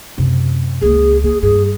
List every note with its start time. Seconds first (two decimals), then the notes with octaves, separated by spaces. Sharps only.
0.18 F#2 C3
0.82 C#2 A#3 G#4
1.24 A#3 G#4
1.42 G2 G#4